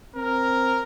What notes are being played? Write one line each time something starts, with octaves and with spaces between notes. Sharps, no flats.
C4 A#4